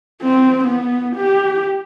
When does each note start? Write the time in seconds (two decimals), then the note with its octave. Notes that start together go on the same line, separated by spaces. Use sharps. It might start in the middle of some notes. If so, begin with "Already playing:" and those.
0.22 C4
0.64 B3
1.16 G4